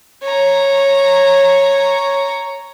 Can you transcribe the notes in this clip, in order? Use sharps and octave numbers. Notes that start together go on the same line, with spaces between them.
C#5 A#5